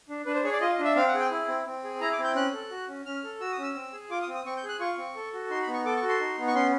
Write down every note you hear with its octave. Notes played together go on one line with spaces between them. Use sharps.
D4
D4 B4
C5
G#4 C#5
D5
F4 D#5
D#5
D4
E5
C4 F5
F#5
G#4 G5
E4
C4
C4
G#4
E4 A#5
D6
C4
G6
C#4 F#6
A4
F#4
C#4
C#4 F6
A4
F#4 E6
D#6
C#4 E6
C4
G#4
F4 D6
D#6
C4
D#6
C4 C#6
G6
G#4
F#6
F4 C#6
C4
A4
F#4
D#4 C6
B5
B3
C#6
A4 D6
C#6
F#4
C6
D#4
B3
C#6
C#4 C6